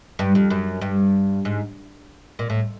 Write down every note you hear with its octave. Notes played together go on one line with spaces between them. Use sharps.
G2
F2
F#2
G2
G#2
A#2
A2